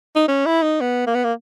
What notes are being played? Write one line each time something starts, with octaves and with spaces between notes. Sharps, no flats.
D#4
C#4
E4
D#4
B3
A#3
B3
A#3